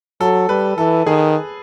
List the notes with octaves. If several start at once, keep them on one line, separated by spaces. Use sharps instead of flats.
F#3 A4
G3 B4
E3 A4
D#3 G#4